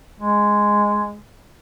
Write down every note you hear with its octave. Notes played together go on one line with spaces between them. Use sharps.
G#3